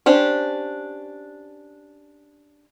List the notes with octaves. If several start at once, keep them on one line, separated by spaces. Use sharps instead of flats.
C#4 D4 G4 C5